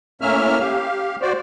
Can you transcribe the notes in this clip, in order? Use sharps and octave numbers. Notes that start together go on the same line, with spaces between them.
A2 A#3 C#4 E5 F6
G4 F5
F#4 C5 D5